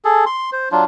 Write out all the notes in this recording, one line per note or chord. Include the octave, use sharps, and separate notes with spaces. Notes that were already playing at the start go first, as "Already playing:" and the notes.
G#4 A4
C6
C5
F#3 D4 F4